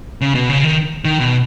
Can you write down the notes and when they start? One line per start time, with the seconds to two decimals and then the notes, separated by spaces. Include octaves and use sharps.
0.21 C#3
0.35 B2
0.49 C#3
0.64 D#3
1.05 D#3
1.19 B2